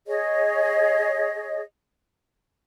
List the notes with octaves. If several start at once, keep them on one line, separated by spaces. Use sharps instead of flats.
G#4 C#5 D#5